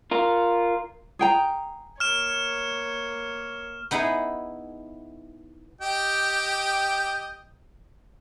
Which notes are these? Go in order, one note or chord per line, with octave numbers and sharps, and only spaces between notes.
F4 A#4
G#4 G5 A#5
A#3 C#5 F6 E7
B3 D#4 E4 G#4
G4 D#5 G5